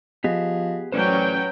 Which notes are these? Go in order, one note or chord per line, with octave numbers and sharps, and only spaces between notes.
F3 B3 G4 G#4 D#5
A1 F#3 C#4 B4 C5 D5 G5